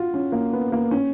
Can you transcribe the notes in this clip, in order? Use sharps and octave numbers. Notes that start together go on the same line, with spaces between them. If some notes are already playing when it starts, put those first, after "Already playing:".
Already playing: F4 F#4
C#4
A#3
B3
A#3
C#4